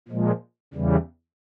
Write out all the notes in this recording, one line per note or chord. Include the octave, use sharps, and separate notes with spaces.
A#2 F3 G#3
E2 C#3 E3 G3